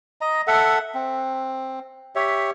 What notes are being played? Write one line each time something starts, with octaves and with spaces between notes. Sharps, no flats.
D#5 A#5
A4 E5 F#5
C4
G4 C#5 E5